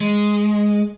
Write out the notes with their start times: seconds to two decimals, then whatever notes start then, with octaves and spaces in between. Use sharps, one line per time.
0.01 G#3